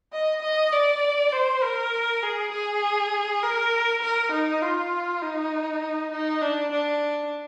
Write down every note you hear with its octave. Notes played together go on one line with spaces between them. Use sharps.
D#5
D#5
D5
C5
A#4
G#4
G#4
A#4
A#4
D#4
F4
D#4
D#4
D4
D4